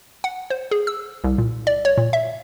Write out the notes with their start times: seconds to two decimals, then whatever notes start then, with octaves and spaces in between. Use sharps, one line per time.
0.24 F#5
0.50 C5
0.71 G#4
0.87 E6
1.24 C2
1.38 A#2
1.67 D5
1.85 C#5
1.98 A#2
2.13 E5